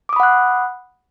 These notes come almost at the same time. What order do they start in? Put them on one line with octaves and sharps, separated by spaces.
D6 D#6 B5 F#5 F#6